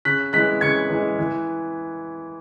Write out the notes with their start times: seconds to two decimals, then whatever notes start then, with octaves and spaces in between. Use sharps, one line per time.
0.05 C#3 F#6 B6
0.33 E3 G#3 F#6 B6
0.61 C#3 G#6 C#7
0.90 E3 G#3
1.19 E3